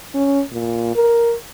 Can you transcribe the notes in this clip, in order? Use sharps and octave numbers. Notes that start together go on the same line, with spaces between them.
C#4
A#2
A#4